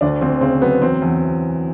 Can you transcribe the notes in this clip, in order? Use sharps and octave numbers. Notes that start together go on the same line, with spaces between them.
D2 D4
D2 C4
C#3 C4
F#3 B3
E2 C4
E2